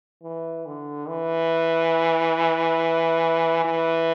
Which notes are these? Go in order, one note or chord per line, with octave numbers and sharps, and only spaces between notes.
E3
D3
E3
E3